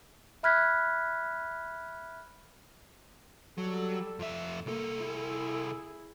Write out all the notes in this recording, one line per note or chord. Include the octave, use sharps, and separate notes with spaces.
E5 B5 F6 F#6 G#6 B6
F#3 G3 A4
F2 E5
C2 A#3 A4
E4 G#4